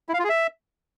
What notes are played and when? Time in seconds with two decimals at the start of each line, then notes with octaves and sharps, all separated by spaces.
0.09 E4
0.14 F5
0.19 F4
0.24 G#4
0.29 E5